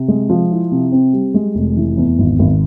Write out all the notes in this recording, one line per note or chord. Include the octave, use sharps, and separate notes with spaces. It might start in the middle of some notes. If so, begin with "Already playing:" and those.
Already playing: C3
G#3
F3
E4
C3
C4
G3
G#3
F1
E3
E2
G#1
G#1